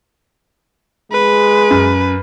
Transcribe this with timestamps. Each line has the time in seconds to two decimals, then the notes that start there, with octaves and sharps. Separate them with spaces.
1.12 G#3 B4
1.71 F#2